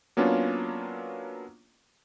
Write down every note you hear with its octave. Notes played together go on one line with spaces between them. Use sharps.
F#3 A#3 B3 C#4 D4 F4